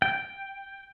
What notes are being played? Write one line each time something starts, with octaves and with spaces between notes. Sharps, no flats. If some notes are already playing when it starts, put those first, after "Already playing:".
G5